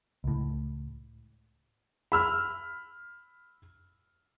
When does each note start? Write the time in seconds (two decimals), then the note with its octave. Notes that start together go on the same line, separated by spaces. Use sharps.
0.24 C#2 A2
2.12 B5 E6 F6